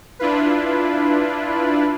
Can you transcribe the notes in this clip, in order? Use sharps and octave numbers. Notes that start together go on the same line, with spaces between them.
D4 E4 F4 B4